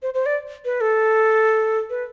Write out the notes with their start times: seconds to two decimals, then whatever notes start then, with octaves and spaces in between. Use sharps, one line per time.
0.02 C5
0.14 C5
0.26 D5
0.65 B4
0.81 A4
1.90 B4